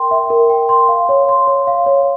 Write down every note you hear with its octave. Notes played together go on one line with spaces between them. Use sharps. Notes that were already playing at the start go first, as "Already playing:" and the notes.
Already playing: A#4 G5 C6
E5
A#4
G5
C6
F5
C#5
C6
C#5
F5
C#5